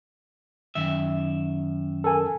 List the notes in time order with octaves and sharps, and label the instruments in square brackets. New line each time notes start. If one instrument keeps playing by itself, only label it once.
[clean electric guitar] F#2 D#3 E5
[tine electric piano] A4 A#4 G#5